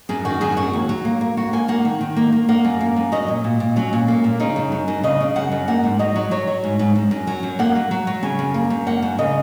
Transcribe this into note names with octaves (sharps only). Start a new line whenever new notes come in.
F#2 G#4
D#3 F#4
F#2 G#4
F#3 F#4
D#2
F#3
A#3
A#3
A#3 F#4
A#3 G#5
A#3 F#5
D#3
D#3
A#3
A#3
A#3 F#5
F#2
A#3
F#2
F#3 D#5
A#2
A#2
A#2
F#3 C#4
A#2
A#3
A#2
C#3 D#4
F#2
F#2
F#2
C#3 D#5
C#3
F#2 F#5
F#2
A#3 F#5
G#2
F#3 D#5
F#3
F#3 C#5
F#3
G#2
G#2
F#2
F#2
F#3
F#2
A#3 F#5
F#3
F#3
F#3
C#3 G#5
F#2
A#3
F#2
A#3 F#5
F#2
C#3 D#5